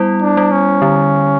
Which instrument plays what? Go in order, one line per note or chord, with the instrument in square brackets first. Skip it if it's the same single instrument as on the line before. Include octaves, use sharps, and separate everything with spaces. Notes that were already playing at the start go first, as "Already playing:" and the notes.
Already playing: [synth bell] G3 B3 E4
[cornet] D4
[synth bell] G3
[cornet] C#4
[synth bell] D3